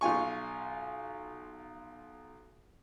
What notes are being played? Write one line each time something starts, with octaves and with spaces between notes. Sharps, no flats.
B1 F4 G#5 C#6